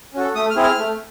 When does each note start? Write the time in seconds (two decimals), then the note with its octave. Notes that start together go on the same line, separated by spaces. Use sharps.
0.14 C#4 F#4 A4
0.35 A3 D#6
0.50 F6
0.56 C4 E4 G#4
0.63 F6
0.78 A3